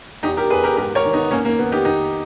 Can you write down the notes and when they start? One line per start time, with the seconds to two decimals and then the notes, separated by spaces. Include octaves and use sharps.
0.23 E2 D#4 G4
0.37 G4 A#4
0.50 E2 G#4 B4
0.63 G4 A#4
0.77 G#2 G4 A#4
0.95 A#4 C#5
1.05 D#3
1.13 B3 D#4
1.31 D#3 A#3 C#4
1.45 A#3
1.59 D#3 B3
1.71 D#4 G4
1.85 D#3 D#4 G4